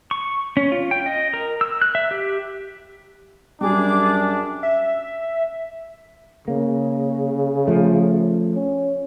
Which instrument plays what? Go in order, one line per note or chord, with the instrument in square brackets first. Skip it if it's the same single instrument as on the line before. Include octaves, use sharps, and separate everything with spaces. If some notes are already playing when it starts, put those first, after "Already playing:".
[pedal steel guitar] C#6
C#4
F4
G5
D#5
A#4
E6
F#6
E5
G4
[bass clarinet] F#2 [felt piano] F#3 G3 [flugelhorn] D4 [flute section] G#4 D6
[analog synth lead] E5
[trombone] C#3 [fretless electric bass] A#3
[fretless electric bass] F3 A3
[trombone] C#4